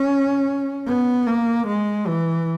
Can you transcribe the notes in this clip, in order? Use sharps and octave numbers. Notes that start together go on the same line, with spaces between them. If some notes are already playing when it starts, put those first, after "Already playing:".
Already playing: C#4
B3
A#3
G#3
E3